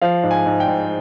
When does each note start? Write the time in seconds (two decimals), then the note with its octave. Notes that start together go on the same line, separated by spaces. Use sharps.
0.02 F3 F5
0.23 G#2
0.31 G#5
0.46 G#2
0.60 G5
0.68 G#2